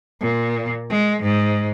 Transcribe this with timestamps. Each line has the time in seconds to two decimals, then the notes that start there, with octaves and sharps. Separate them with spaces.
0.21 A#2
0.90 G#3
1.23 G#2